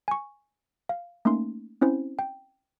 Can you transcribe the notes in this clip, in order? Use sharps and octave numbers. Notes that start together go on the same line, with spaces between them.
G#5 C#6
F5
A3 A#3 C#4 D#4 C6
C4 C#4 E4 C5
G5